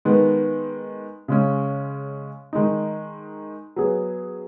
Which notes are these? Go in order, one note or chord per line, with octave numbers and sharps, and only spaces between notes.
D#3 G#3 B3
C#3 G#3 C#4
D#3 G#3 D#4
F#3 B3 G#4